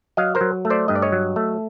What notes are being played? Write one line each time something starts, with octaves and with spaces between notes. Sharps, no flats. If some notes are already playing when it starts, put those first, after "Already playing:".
F#3 D#5 F5
A#4 C5
F#3
A3
C5 D5
G2 D#5
D5
C#5 D#5
F#3
A3